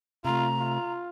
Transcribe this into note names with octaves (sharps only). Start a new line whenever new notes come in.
C3 A3 F4 A#5
F4